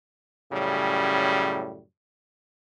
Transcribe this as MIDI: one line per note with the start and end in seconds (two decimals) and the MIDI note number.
0.51 1.83 42
0.51 1.83 45
0.51 1.83 49
0.51 1.83 55